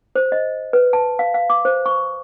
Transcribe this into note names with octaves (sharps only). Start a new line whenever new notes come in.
C5
D#5
B4
A5
F5
F5
D6
C5
C#6